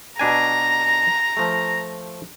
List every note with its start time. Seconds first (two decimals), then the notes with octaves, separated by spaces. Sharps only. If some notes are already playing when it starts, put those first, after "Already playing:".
0.19 B2 D4 G#5 A#5
1.37 F3 A3